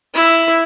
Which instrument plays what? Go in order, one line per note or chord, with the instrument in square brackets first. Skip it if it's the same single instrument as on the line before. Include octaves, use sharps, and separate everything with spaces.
[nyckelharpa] E4